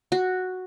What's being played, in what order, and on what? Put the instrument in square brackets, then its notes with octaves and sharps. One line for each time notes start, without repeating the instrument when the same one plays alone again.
[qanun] F#4